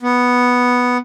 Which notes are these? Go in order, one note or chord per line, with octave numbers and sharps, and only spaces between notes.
B3